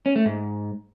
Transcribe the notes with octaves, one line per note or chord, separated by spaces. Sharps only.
C#4
A3
G#2